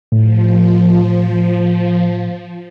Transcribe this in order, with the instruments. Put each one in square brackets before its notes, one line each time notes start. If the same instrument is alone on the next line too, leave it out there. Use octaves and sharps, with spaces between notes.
[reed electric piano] A2 [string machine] F3